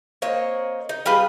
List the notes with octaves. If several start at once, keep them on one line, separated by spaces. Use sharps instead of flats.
A#3 C4 C#5 D#5
D#4
G3 F4 G#4 B4